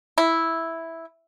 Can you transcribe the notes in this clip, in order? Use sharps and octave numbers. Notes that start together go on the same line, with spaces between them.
E4